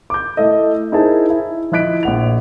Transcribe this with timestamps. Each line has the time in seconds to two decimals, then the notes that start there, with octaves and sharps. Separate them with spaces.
0.10 D6 G6
0.37 A3 E4 A4 D#5
0.92 D#4 E4 G#4 A#4 C5 A5
1.30 E4
1.72 F3 E4 D#5 F#6 B6 D7
2.03 A#1 F#5 F7